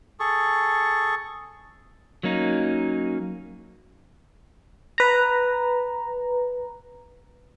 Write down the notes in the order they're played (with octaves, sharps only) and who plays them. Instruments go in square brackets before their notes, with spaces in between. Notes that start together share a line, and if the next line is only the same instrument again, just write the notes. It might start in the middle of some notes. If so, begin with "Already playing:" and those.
[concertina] G#4 A4 C#6
[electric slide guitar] F#3 A#3 C#4 D#4
[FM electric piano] B4 A#5